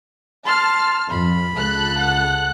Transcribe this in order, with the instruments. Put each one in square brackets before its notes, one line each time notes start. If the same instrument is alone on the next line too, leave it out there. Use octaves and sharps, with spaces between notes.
[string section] A5 F6 [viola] C6
[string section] F2 [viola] B5
[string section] C#2 A4 F#6
[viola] F#5